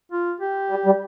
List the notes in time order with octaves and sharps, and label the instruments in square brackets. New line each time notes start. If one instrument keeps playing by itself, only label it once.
[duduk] F4
G4
[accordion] G3
G3